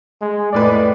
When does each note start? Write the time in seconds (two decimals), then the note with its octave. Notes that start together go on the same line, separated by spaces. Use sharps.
0.21 G#3
0.53 F1 A2 B4 D5